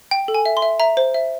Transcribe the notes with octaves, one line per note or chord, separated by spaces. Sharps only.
G5
A4
G#5
E5
C6
E5
E5 A#5
C5
E5